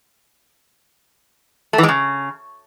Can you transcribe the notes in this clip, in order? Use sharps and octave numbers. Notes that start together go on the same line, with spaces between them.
A3
E3
G#3
C#3